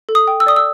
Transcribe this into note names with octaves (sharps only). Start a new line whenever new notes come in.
A4
D#6
G5
E6
D5 D#6
E6